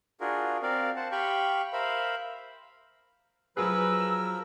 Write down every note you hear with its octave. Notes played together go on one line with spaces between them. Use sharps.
D4 F4 F#4 G#4 A#4
C4 A#4 D5 F5
C5 F#5 A5
G4 F5 G5 B5 C#6
A#4 C5 E5 F5 B5
F3 F#3 G#4 A#4 B4 E6